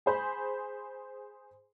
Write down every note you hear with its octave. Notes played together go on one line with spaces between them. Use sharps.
G#4 C5 B5